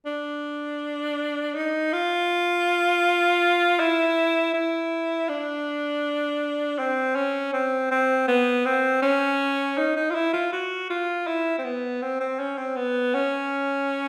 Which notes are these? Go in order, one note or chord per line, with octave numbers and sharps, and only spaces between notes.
D4
D#4
F4
E4
E4
D4
C4
C#4
C4
C4
B3
C4
C#4
D#4
D#4
F4
E4
F4
F#4
F4
E4
C4
B3
C4
C4
C#4
C4
B3
C#4